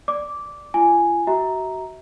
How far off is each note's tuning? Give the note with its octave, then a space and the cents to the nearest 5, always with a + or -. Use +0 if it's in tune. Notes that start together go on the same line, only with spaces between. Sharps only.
D5 +5 D6 -10
F4 -40 G#5 +0
F#4 +30 E5 -30 A#5 +0